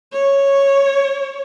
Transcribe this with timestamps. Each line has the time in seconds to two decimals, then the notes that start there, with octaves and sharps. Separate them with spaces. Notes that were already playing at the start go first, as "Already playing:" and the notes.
0.12 C#5